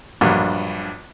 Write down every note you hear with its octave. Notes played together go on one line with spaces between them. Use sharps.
A#1 G2 F#3